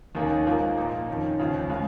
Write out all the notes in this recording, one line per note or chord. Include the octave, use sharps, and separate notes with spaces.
D#2 D#3 A#3 C#4 G#4
G#2 F3 A#3 F4
A#2 A#3 D#4
F2 D#3 C#4
D#2 C#3 F3
C#3 G#3 F4